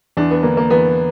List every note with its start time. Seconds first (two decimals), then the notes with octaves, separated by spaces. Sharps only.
0.17 E2 D4
0.31 B3
0.43 D3 A#3
0.57 A#3
0.70 E2 B3